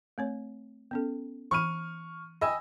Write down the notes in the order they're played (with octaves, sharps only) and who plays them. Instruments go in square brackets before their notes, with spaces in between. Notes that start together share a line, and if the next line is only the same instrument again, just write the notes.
[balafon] A3 C4 C#5
B3 C#4 A4
[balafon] E3 B5 [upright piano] C#6 F6 D#7
[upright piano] D#5 G#5 E6 [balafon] G5 B5